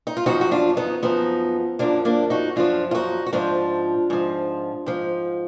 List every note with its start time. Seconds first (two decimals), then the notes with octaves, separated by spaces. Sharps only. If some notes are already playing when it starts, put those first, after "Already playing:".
0.07 D#4
0.17 F4
0.26 F#2 F3 D#4 F#4
0.41 F#4
0.51 D4 F4
0.77 B3 D#4
1.02 F#2 F3 B3 D#4
1.79 F#2 F3 A#3 D4
2.05 A#3 D4
2.30 D#4 F#4
2.56 F#2 F3 D4 F4
2.91 F4
2.94 D#4 F#4
3.26 F#4
3.33 G#2 F3 D4 F4
4.10 G#2 F3
4.86 G#2 F3